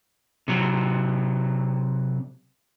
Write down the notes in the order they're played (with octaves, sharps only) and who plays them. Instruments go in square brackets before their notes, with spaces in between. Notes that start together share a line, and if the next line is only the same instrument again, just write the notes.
[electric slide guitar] C3 F#3